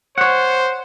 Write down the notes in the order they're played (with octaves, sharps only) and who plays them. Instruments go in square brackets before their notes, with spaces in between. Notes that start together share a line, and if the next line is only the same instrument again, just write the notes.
[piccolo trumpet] C5 [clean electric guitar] C#5 F#5